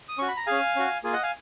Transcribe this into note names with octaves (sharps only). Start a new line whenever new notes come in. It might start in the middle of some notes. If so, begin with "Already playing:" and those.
D#6
C#4 F#4 C#6
B5
A#5
C#4 G#4 F5 G#5
C#4 F#4
A#3 F4 G#4
D#5 F#5
F5 G#5